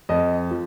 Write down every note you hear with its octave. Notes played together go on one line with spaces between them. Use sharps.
F2 D#5
F3